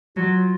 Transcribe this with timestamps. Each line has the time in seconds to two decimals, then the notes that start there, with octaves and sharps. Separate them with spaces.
0.17 F#3 F4